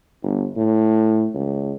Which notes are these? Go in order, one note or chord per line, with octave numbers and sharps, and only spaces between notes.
G1
A2
C#2